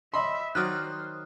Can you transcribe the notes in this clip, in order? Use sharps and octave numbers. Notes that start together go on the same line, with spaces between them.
D#5 E5 B5 C6
D#3 F#3 C5 D5 D#6 F6 F#6